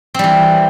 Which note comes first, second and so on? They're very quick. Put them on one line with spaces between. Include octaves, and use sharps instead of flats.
C4 G3 E3